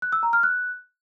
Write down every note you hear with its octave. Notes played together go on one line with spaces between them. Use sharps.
F#6
E6
A#5
F6
F#6